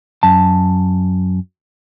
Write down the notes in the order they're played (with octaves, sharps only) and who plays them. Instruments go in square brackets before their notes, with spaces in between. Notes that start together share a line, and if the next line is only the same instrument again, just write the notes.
[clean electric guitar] F#2 A5